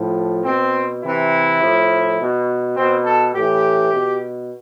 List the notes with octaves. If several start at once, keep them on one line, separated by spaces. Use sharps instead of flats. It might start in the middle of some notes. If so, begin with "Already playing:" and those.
Already playing: A2 F3
B2 C4
C3 E3 E4
A2 F3
B2
B2 C4
A4
A2 E3 G4
B2